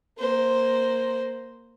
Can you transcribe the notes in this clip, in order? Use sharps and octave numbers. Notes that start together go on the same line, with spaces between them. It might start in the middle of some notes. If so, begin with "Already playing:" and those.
A#3 C5